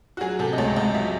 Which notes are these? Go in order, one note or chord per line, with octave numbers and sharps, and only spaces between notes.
F#4
F#3 G#4
C3 A4
D#5
C#2 C#5
C#2 D#5
F#3 E5